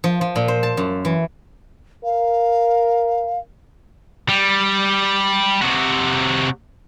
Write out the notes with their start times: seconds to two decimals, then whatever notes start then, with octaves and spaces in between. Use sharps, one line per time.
0.04 F3
0.21 F3
0.36 A#2
0.48 C5
0.63 A5
0.77 F#2
1.05 E3
2.04 A#4 F5
4.29 G3
5.62 C3 F#4